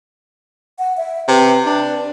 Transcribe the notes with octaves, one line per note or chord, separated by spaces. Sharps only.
F#5
E5
C3 B4
D4